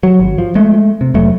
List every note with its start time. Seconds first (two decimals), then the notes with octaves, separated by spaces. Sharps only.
0.03 F#3
0.20 G#1
0.38 F3
0.55 G#3 A3
1.01 C3
1.14 F1 F#3 A3